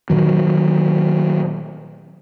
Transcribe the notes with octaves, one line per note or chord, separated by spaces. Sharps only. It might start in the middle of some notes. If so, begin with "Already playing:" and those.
A#2 D#3 F#3